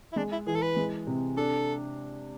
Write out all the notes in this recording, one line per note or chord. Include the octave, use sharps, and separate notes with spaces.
E4
G#3 D4
E4
E3 G#4
A4
B4
G#3
C3
D4 A4